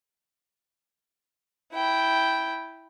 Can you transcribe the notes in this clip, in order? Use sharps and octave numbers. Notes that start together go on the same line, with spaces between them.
E4 G5